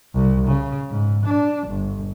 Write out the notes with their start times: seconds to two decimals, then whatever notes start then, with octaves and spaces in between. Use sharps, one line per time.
0.14 C2
0.48 C#3
0.90 G#2
1.26 D4
1.68 G1